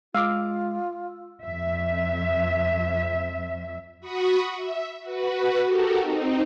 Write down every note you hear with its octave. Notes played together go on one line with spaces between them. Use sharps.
G#3 F4 F5 D6 E6
F2 E5
F#4 B5 C#6 D#6
E5
F#4 B4
F#4 G4 A4 A#4
C4 D#4